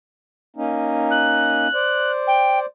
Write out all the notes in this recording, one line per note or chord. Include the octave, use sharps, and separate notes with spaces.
A#3 C#4 D#4
F#6
C5 D5
G5